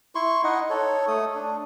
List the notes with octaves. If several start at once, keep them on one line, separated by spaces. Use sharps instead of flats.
E4 C6 C#6
D#4 D#5 F#5
A4 C#5
A3 D#6
D4